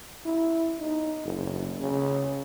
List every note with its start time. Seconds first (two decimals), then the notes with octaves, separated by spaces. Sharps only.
0.26 E4
0.80 D#4
1.25 F#1
1.80 C#3